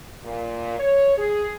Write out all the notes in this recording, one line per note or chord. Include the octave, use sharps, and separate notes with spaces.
A#2
C#5
G#4